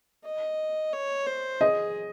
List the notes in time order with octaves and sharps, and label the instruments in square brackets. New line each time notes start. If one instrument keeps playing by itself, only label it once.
[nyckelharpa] D#5
C#5
C5
[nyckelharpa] G#4 [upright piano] D#5